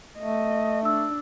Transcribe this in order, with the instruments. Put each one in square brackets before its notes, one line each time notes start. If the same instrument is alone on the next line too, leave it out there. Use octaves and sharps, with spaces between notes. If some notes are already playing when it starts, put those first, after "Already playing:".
[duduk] A3 [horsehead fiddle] D#5
[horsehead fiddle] D4 [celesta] E6